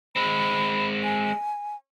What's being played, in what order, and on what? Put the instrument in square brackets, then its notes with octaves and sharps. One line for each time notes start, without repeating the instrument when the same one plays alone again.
[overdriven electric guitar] G#3 C4 [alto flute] B5
[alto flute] G#5